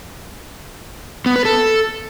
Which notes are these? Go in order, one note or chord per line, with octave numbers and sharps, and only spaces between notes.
B3
B4
A4